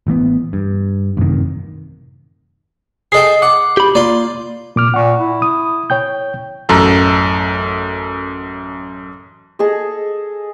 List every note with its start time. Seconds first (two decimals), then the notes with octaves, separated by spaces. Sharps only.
0.07 A1 E3 A#3 B3
0.53 G2
1.17 A1 F#2 C3 D#3
3.12 G#4 A4 D#5 G5 C7
3.42 F#5 D6
3.77 G4 B5
3.95 A#3 F4 D5 C6
4.76 A#2 D6 F6
4.94 A#2 F#5 C#6
5.19 E4
5.42 D#6
5.90 C#5 G5 G6
6.69 A1 F#2 A4 A#5
9.59 G#4 A4 D#5